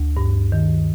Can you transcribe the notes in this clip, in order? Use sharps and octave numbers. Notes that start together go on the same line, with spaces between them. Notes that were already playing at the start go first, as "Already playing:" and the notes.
Already playing: D2
G2
D#3